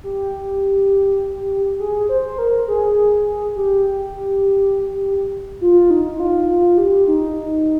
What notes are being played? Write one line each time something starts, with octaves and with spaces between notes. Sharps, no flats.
G4
G#4
C5
A#4
G#4
G4
F4
D#4
D#4
F4
F4
G4
D#4